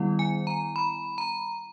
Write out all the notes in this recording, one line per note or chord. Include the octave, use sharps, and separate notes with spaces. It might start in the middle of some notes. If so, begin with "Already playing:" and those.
Already playing: D#3 G3 B3 E4
G#5
A#5
B5
A#5